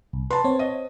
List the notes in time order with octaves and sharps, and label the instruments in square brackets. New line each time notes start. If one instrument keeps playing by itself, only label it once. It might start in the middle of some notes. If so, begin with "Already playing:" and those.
[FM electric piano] C2
[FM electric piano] B4 [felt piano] A5 C6
[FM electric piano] C4 C#5
[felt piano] D#5